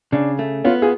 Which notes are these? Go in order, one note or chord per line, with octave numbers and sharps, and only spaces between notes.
C#3 D4
A3
B3 C#4 F4
F4 G#4